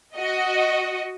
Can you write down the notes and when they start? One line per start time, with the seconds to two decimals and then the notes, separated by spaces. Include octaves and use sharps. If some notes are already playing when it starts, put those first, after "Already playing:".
0.16 F#4 D#5